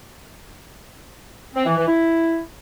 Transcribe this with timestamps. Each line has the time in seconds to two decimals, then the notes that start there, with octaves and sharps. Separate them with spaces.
1.55 C4
1.66 E3
1.77 E3
1.87 E4